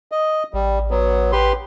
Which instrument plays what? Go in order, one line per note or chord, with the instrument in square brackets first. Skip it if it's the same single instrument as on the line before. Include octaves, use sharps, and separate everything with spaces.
[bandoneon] D#5
[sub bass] A1 [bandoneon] G3
[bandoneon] F#3 B3
G4 B4 C6